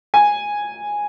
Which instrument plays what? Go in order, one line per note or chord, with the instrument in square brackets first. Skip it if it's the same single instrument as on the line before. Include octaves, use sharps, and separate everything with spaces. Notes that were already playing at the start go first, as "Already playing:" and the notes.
[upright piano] G#5